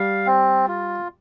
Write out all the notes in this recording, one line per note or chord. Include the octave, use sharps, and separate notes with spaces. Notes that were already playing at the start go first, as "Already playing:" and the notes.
Already playing: G3 F5
C4
F4